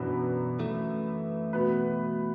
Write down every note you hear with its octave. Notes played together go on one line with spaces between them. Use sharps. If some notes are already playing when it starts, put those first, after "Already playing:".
Already playing: F#2 B2 E3 F#3 D4 B4
E3 A3
B2 B3 F#4 B4